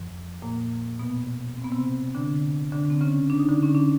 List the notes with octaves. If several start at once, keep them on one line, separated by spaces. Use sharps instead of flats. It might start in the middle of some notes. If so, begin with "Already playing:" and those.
Already playing: F2 F3
A#2 A#3
B2 B3
C4
B3
C3 C4
D3 D4
D3 D4
C4
C#3 C#4
D4
D#4
D3 D4
C#4
D4